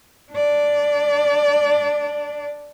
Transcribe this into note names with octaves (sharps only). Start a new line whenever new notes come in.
D4 D5